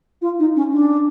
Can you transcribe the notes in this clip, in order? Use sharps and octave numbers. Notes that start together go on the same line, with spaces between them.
F4
D#4
C#4
D4